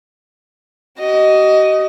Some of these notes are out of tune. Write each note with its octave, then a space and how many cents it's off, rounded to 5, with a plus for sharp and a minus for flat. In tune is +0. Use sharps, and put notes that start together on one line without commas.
F#4 +45 D#5 +0